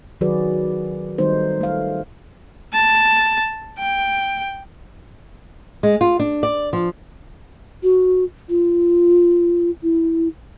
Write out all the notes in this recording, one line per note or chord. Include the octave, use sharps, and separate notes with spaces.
D#3 F#3 F#4 G#4 B4 D5
D#3 G3 A3 D#4 C5
A3 F5
A5
G5
G#3
F4
D4
D5
F3
F#4
F4
E4